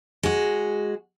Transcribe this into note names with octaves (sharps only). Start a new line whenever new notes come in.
G#3 F#4